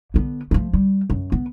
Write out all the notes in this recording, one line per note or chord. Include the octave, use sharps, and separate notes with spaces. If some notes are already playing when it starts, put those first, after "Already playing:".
D3 B3
F3 A3
G3
F#2
B3